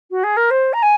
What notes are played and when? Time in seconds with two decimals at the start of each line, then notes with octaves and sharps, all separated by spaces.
0.10 F#4
0.23 G#4
0.36 A#4
0.50 C5
0.73 A#5
0.82 G#5